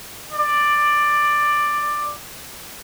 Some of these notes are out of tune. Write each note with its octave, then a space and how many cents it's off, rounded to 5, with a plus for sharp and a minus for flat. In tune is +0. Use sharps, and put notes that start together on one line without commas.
D5 +10